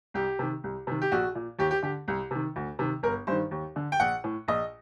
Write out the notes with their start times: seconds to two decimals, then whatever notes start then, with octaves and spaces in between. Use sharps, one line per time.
0.14 C2 G4
0.39 C3 D#3
0.64 C2
0.87 C3 D#3
1.02 G4
1.12 A#1 F#4
1.35 A#2
1.59 D#2 G4
1.71 G4
1.83 D3 G4
2.08 C2
2.31 C3 D#3
2.56 D2
2.79 C3 D#3
3.03 G1 A#4
3.27 G2 D#3 C5
3.51 D#2
3.76 D3
3.92 G5
4.00 A#1 F#5
4.24 A2
4.48 A#1 D#5